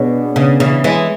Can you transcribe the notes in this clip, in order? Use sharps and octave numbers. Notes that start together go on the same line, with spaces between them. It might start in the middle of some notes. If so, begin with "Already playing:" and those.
Already playing: B2 B3 D4 G#4 C#5
C#3
C#3 E3
E3 G#3